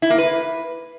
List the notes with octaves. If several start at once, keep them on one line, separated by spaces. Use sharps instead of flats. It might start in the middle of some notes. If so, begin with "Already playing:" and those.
E4
A#3
B4